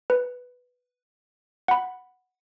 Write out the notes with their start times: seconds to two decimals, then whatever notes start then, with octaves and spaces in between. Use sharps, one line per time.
0.10 B4
1.68 F#5 B5